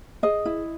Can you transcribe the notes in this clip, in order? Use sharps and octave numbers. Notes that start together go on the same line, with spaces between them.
G#4 D#5
E4